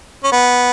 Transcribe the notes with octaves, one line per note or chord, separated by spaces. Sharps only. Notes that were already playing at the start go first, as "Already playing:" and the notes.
C#4
B3